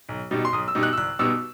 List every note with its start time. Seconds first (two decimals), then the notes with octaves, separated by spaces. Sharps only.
0.09 B1
0.31 B2 G3 D#4
0.45 C6
0.52 B1 D#6
0.68 E6
0.75 B2 G3 D#4
0.83 F#6
0.93 E6
0.97 C2 F#6
1.19 B2 G3 B3 D#4 E6